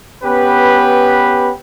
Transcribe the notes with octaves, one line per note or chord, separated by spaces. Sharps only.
B3 C#4 G4 B4